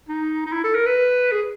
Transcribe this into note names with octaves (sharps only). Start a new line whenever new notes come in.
D#4
D#4
E4
A4
A#4
B4
G#4